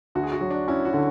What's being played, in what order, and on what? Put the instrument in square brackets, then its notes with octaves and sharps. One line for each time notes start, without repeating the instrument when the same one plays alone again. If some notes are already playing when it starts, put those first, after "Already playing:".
[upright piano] D2 [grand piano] F#4
[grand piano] G#4
F#4
[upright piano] F#3
[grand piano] D4
[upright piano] C#4 [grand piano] E4
[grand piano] F#4
[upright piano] D3